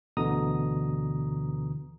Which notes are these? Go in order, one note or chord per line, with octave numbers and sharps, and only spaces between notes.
D2 B2 D3 E3 A#5 D#6